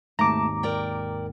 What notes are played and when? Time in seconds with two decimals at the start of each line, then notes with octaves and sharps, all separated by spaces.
0.19 G#1 D#2 G#2 A3 A5 A#5 D6
0.63 A#4 D5 G5